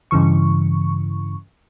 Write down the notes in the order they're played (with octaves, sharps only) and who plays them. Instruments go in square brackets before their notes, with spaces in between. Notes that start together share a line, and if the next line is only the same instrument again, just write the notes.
[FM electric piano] G2 C#3 E3 C#6